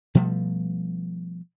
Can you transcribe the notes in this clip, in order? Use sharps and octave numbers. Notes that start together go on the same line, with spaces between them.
B2 F3 G3 A3